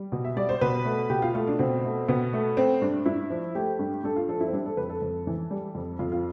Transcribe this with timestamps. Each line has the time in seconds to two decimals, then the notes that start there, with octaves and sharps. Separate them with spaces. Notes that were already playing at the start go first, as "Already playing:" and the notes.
Already playing: G3
0.12 B2
0.25 E5
0.37 G3 D5
0.49 C5
0.61 B2 B4
0.85 A3
1.10 B2 G4
1.22 F4
1.34 A3 F4
1.47 D4
1.59 B2 C4
1.84 A3
2.08 B2 B3
2.33 A3
2.57 A3 C4
2.81 G2 D4
3.06 G2 E4
3.30 F3
3.55 A3 G4
3.79 G2
4.03 G2 A4
4.16 F4
4.29 F3 A4
4.40 E4
4.48 C4
4.52 G3 D4
4.66 A4
4.77 F2 B4
4.89 A4
5.02 F2
5.27 E3
5.51 G3
5.75 F2
5.99 F2 F4
6.12 F4